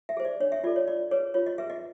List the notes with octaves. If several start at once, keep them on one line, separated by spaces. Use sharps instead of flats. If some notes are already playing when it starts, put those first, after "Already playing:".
E5
G#4 C5
D5
D4 C#5
E5
F4 A4 D5
C#5
F4 D5
G#4 B4 C#5
F4 C#5
D#5
G#4 B4 E5
D#5